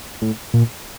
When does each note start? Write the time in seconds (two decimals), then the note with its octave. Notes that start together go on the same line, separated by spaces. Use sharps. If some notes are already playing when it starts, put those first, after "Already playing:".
0.22 A2
0.54 A#2